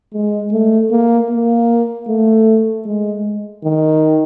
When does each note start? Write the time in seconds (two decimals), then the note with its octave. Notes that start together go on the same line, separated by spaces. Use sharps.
0.13 G#3
0.52 A3
0.91 A#3
1.30 A#3
2.08 A3
2.86 G#3
3.64 D#3